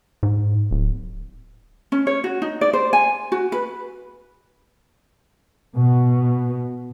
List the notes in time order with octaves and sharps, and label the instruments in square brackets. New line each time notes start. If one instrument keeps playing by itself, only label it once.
[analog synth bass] G#2
D1
[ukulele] C#4
C#5
F#4
D#4
D5
C5
G#5
F#4
B4
[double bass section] B2